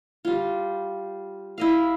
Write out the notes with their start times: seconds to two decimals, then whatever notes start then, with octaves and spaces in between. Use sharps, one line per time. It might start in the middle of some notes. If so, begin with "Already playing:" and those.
0.25 G3 F4
1.58 E4 D#5 F5